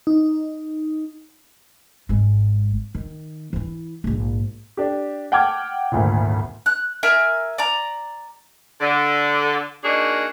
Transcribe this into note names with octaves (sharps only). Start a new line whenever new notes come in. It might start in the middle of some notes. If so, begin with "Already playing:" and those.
D#4
G#1 G#3
D#3
E3 E4
A#1 G#2
D4 G4
F#5 G5 A5 D6 F6 G#6
G#1 D2 A#2
F#6
A#4 E5 G#5 E6
D5 A#5
D3
A#3 D4 D#4 F#4 G#4